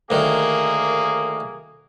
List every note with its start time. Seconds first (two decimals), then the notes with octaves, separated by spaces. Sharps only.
0.10 D2 D#3 A#3 G#4